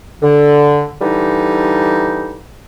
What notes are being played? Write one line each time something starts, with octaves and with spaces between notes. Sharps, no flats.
D3
D3 E3 G3 D#4